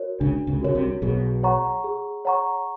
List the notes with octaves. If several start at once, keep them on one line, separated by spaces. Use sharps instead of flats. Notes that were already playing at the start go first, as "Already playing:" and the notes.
Already playing: F#4 A#4 C#5
C#2 C#3 D4
C#2 C#3
C#3 F#4 A#4 C#5
C2 C3
B1 B2 G#4
C#5 F#5 A#5 C#6
G#4
C#5 F#5 A#5 C#6